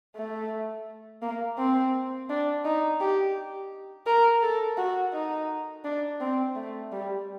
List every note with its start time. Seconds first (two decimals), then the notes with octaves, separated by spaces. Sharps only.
0.15 A3
1.22 A#3
1.58 C4
2.29 D4
2.65 D#4
3.00 G4
4.07 A#4
4.42 A4
4.78 F#4
5.13 D#4
5.84 D4
6.20 C4
6.56 A3
6.92 G3